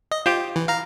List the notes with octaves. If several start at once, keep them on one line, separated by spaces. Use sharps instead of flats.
D#5
F4 G4 C5
E3
F5 A#5